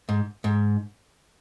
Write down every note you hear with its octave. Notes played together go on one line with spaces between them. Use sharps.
G#2
G#2